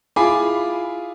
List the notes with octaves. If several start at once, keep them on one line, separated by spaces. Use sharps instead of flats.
E4 F4 G#4 G#5 B5 D6